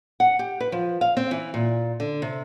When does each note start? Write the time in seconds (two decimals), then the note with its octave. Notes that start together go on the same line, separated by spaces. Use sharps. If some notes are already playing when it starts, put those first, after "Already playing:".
0.20 F#5
0.39 G4
0.60 B4
0.72 F3
1.01 F5
1.17 C4
1.31 E3
1.54 A#2
2.00 D3
2.22 C3